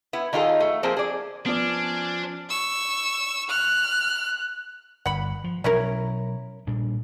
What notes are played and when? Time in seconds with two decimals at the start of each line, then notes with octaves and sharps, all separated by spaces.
0.13 B3 E4
0.33 D#3 D#4 F4 G#4 A4
0.60 A3
0.83 F3 A#3 C4 G#4 C5
0.97 G#4 D5
1.46 F3 B3 C#4 D4 F4 D5 A5
2.50 C#6 E6
3.49 F6 F#6
5.06 G1 F#5 B5
5.44 F3
5.64 B2 F#3 C#4 E4 A#4
6.67 A#2 G3 D4